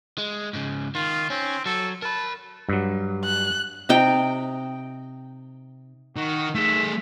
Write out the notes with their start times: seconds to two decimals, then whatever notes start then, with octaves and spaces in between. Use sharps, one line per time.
0.18 G#3
0.53 G#2 C#3
0.95 D#3 F4
1.30 C4 C#4
1.66 F#3 A4
2.02 A#4 A5 B5
2.69 G2 F#3
3.25 F#6
3.89 C3 D#4 G5
6.17 D#3 F#4
6.55 A3 G#4 E5